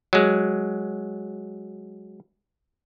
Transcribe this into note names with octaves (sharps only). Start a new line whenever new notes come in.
F#3 G#3